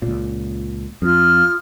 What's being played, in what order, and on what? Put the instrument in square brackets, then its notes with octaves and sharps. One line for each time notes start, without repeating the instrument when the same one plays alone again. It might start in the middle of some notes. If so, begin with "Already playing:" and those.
[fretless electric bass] C#2 A#2
[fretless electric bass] F2 [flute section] F4 D#6 F6